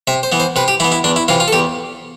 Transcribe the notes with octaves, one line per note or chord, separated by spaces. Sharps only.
C3 E5
C5
E3 B3
C5
C3 B4
G4
E3 B3 E4
E4
E2 D4
E4
C3 E3 F4
F4
A4
E2 G4